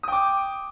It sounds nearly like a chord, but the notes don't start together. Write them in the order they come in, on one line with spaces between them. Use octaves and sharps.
D#6 G5 D6